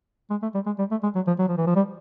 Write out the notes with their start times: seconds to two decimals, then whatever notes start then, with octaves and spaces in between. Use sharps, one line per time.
0.30 G#3
0.42 A3
0.54 G3
0.66 G#3
0.79 G3
0.91 A3
1.03 G#3
1.15 F#3
1.27 F3
1.39 F#3
1.49 F3
1.58 E3
1.67 F3
1.76 G3